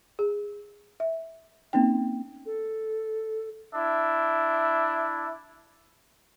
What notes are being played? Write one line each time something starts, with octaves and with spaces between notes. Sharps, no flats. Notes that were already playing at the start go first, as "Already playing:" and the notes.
G#4
E5
A#3 C4 C#4 D#4 G5
A4
D4 E4 E5